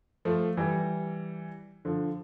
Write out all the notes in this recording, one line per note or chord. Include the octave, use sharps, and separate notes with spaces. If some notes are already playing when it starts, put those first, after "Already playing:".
F3 A3
E3 G3
D3 F3